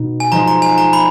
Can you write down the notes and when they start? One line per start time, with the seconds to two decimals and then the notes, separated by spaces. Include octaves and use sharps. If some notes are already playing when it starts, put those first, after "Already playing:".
Already playing: B2 D#4
0.20 G#5
0.32 F3 G#3 D#4 A#5
0.48 A#5
0.62 G#5
0.78 A#5
0.93 B5